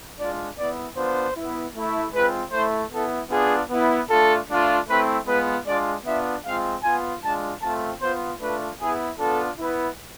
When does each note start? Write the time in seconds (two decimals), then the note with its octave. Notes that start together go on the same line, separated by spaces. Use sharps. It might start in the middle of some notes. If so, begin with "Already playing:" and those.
0.19 G#3 D4 F4 D5
0.57 B3 E4 D5
0.96 B3 D4 F4 C5
1.35 B3 E4
1.75 A3 E4
2.13 G#3 C4 F4 B4
2.52 A3 E4 C5
2.91 B3 E4 A4
3.31 B3 D4 F4 G#4
3.71 B3 E4
4.09 A3 D4 F4 A4
4.49 A3 D4 F4
4.87 A3 C4 E4 B4
5.26 G#3 B3 F4 B4
5.65 G#3 D4 F4 D5
6.05 B3 D4 F4 E5
6.45 G#3 C4 F4 F5
6.83 B3 F4 G#5
7.22 G#3 D4 F4 A5
7.62 A3 C4 F4 A5
8.00 B3 F4 C5
8.40 A3 D4 F4 B4
8.79 B3 E4 G#4
9.18 B3 D4 F4 A4
9.57 B3 E4